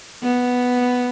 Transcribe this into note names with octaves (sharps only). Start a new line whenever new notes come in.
B3